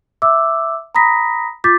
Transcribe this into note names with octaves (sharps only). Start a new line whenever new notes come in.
E5 D6 E6
A#5 B5 D#6 A#6 B6
F4 D6 G6 A6 B6